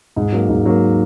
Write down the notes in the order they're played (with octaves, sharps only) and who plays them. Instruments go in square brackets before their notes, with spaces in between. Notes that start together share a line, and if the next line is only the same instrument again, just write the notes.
[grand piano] G#2
F#3 A#3
G#2
F#3 A#3